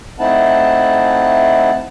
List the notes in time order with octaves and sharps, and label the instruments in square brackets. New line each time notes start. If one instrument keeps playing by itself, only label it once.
[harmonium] A3 C4 D#4 E4 F#5 A5